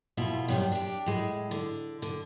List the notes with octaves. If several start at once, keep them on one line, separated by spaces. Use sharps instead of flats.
F2 B2 E4 F4
F#2 C3 G3
D4 G4
A2 G#3
D3
D3